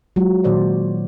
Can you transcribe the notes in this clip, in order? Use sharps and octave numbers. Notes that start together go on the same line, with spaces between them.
F#3 G#3 F4
A#2 D#3 F#4 C5 D5